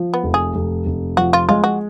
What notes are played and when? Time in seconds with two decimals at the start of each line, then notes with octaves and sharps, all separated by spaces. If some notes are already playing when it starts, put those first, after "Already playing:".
Already playing: F3
0.14 B3
0.24 F1
0.34 G#4
0.55 F1
0.86 F1
1.17 F3 F#4
1.33 F4
1.49 G#3 F4
1.64 F#4